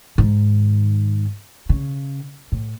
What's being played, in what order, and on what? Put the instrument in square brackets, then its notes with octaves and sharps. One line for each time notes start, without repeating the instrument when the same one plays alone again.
[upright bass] G#2 D#3
C#3
A2